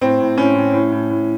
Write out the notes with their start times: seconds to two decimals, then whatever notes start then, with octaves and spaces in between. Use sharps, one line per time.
0.01 A2 C4
0.20 A2
0.37 A2 C#4
0.56 A2
0.73 A2
0.92 A2
1.10 A2